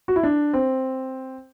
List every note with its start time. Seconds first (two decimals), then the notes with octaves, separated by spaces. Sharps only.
0.08 F#4
0.16 E4
0.23 D4
0.53 C4